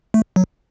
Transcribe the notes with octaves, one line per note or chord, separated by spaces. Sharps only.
A3
F#3